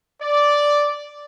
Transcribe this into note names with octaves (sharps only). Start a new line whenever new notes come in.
D5